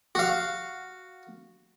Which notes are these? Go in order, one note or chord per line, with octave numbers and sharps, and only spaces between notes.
F#4 F5